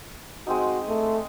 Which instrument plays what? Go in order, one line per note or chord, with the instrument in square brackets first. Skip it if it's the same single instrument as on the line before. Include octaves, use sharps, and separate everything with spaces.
[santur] G#3 C4 D#4 [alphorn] F#4
[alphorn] A3